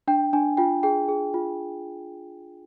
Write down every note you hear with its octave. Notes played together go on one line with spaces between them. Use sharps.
D4 G5
D4 G#5
F4 G5
G#4 G5
G#4
F4